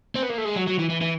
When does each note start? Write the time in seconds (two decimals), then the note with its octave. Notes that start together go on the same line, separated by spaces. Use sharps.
0.15 C4
0.23 B3
0.30 A#3
0.38 A3
0.45 G#3
0.56 F#3
0.67 F#3
0.79 E3
0.90 E3
1.01 E3